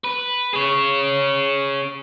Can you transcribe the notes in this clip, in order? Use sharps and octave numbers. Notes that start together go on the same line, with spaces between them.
B4
G#4 C#5